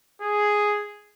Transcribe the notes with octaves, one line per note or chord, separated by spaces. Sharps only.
G#4